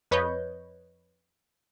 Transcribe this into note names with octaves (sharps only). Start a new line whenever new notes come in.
F2 B4 C#5 D#5 G6